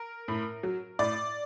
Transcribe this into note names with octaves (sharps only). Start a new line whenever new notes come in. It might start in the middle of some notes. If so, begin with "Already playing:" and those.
Already playing: A#4
A2
F#3
A2 D5